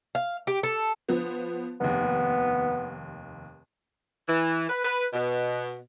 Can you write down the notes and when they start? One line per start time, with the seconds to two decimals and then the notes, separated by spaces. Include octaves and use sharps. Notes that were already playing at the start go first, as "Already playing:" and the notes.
0.15 F5
0.47 G4
0.63 A4
1.09 F3 B3
1.81 F1 D#2 B3
4.29 E3
4.69 B4
4.85 B4
5.13 B2